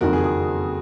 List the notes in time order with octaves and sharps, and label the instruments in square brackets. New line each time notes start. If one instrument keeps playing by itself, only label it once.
[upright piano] F#1 F2 D#3 [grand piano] F#4 A#4
[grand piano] G#4
G#4